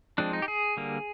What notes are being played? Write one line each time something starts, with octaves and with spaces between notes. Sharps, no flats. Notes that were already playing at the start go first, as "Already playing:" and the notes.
F3 G#3 C4 D4
D#4
G4
G#4
D3 G3 A#3